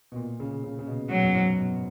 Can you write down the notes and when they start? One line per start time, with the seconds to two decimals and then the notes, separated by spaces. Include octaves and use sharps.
0.12 B2
0.16 A#2
0.40 C#3
0.64 C#3
0.79 C#3
0.87 B2
1.10 B2 F#3
1.24 F#2
1.34 G#2
1.57 B2